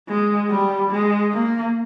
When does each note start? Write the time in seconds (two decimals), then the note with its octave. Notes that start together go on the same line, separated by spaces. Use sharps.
0.08 G#3
0.50 G3
0.91 G#3
1.33 A#3